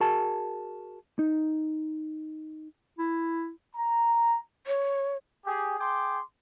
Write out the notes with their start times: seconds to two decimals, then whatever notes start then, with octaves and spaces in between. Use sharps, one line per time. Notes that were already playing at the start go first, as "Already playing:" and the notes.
0.01 F#4 G#4 A#4 A5
1.19 D#4
2.98 E4
3.76 A#5
4.67 C#5
5.45 G4 G#4
5.79 G#4 G5 C6 D6